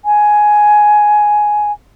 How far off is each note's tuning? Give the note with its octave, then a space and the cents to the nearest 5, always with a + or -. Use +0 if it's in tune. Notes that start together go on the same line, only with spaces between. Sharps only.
G#5 +10